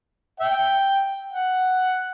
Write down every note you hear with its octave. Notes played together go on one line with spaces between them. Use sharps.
E5 G5
F#5